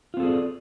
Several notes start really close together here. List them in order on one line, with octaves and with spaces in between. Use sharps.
F4 C4 A4 G#4 D5